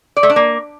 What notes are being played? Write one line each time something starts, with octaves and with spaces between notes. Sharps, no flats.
D5
A3
D4
A#3